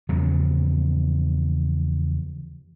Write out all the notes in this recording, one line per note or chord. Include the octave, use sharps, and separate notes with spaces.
E2 C#3 F3 F#3